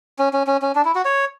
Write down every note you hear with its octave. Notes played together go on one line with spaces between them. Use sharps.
C#4
C#4
C#4
C#4
D4
E4
F#4
C#5